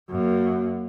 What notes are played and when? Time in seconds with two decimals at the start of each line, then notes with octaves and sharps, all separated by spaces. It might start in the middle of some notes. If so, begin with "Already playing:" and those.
0.10 F#2 A#3